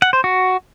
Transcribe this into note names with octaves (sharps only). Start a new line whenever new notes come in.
F#5
C5
F#4